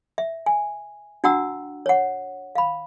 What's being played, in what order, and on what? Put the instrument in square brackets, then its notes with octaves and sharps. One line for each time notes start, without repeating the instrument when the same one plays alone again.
[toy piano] E5
G#5
D4 F#4 F#5 G5 A#5 E6
C#5 F#5
F5 B5